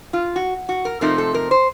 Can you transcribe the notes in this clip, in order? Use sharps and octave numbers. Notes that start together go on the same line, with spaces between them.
F4
F#4
F#4
A#4
C3 F3 A3 C4 D#4 A#4
A4
A#4
C5